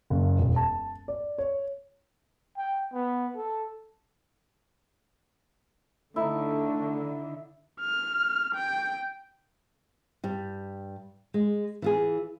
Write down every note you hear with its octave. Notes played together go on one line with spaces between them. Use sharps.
F#1
E1
A5
D5
C#5
G5
B3
A4
D3 A3 D#4 E4
F6
G5
G2 G3
G#3
E3 F4 G#4